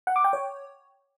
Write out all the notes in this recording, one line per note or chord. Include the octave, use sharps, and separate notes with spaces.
F#5
D6
G5
C#5